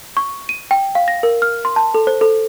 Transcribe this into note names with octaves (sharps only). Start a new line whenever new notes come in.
C#6
D#7
G5
F5
A#6
A#4
F6
C6
A5
A4
C5
A4